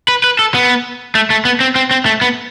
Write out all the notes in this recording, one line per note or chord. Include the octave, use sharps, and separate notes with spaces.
B4
B4
A4
B3
A3
A3
B3
C4
C4
C4
A3
B3